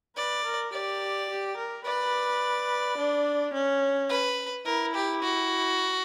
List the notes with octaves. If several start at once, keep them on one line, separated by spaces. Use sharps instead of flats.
B4 D5
A#4
G4 D5
G4
A#4
B4 D5
D4
C#4
B4
E4 A#4
G4
F#4